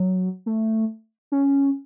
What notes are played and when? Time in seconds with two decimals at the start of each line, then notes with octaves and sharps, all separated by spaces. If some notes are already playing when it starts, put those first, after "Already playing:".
Already playing: F#3
0.46 A3
1.32 C#4